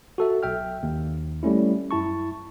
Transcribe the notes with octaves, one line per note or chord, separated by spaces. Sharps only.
F#4 A4 E5
B1 E5 G5 F6
D#2
G3 A3 C#4 E4
F#2 E4 A5 C#6